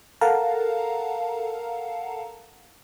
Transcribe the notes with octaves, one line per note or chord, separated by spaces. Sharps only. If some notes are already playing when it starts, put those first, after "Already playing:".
A4 A#4 F5 F#5 A5 A#5